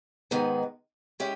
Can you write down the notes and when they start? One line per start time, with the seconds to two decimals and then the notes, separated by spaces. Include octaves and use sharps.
0.31 G#2 D#3 G#3 B3
1.20 G#3 C#4 E4 G4